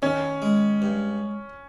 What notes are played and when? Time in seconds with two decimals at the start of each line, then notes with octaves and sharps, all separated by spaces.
0.02 D#3 C#4
0.42 G#3
0.82 G2